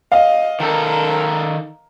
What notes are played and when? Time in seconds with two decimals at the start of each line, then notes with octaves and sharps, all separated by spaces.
0.12 D#5 F5
0.60 D#3 A4 A#4